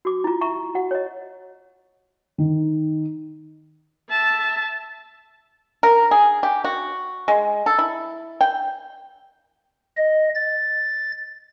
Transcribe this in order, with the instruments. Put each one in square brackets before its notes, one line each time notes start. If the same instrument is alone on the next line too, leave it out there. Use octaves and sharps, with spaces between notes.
[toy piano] F#4 D6
E4 F4
E5 A#5 C#6
F#4 F#5
C#5 D#5
[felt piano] D#3
[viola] E5 A5
[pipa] A#4
G#4
G4
F#4
G#3
A4
E4
G5
[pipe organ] D#5
A6